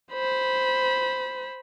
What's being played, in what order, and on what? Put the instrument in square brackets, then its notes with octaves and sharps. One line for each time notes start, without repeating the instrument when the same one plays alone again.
[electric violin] C5 B5